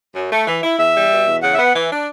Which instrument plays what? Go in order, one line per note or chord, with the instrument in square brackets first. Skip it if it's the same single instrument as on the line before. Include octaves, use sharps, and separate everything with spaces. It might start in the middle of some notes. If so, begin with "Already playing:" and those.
[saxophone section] F#2
A3
E3
E4
[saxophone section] E2 [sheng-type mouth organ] E5
[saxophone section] G3
B2
E2
[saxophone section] C#3 [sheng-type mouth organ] F#5
[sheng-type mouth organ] E5
[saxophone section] B3 [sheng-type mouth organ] F#5
[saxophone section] E3
D4